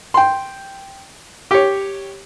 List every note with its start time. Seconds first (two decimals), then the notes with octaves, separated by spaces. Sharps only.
0.14 G5 C6
1.51 G4 C#5